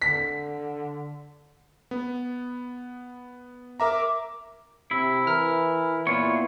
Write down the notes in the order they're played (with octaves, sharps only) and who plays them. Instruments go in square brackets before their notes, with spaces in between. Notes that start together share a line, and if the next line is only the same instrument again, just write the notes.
[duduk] D3 [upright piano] B6
[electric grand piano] B3
[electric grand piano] A#4 E5 A#5 [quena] D6
[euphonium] C3 [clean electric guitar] E4
[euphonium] E3 [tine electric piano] A#4 F6
[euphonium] A#2 [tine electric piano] B3 E4 [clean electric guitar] F4 C#5